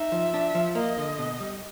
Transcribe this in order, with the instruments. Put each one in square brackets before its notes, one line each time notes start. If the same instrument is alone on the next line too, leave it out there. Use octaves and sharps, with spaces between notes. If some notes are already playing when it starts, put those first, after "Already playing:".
Already playing: [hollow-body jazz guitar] D#4 [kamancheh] E5
[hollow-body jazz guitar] F3
D4
F3
[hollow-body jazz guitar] A#3 [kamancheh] D#5
[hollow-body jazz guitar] D3
B2
G3